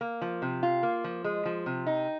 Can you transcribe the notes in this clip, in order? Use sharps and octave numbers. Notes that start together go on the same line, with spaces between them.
A#3
F3
C3
F4
A#3
F3
G#3
F3
C3
D#4